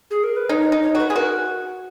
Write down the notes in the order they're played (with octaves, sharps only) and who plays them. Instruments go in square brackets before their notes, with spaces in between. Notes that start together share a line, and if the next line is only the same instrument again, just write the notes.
[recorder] G#4
A#4
B4
[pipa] D#4 [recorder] C#5
[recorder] C#5
D#5
[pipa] D#4
[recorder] C#5
[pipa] F#4 [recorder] B4
[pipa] G#4 [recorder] B4
[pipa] F#4 [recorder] A#4